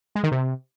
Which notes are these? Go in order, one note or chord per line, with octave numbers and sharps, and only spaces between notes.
G#3
D#3
C3